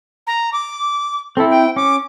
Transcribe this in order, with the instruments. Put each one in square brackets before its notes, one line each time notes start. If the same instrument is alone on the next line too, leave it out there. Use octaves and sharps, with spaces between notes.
[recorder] A#5
D6
[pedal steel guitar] C4 E4 [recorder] A4
[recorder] G5
[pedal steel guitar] C#4 [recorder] D6